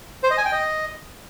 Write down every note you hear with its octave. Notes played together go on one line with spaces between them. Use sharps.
C5
D#5
G#5
G5
D#5